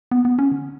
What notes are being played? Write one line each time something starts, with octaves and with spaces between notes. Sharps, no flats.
B3
B3
C#4
D3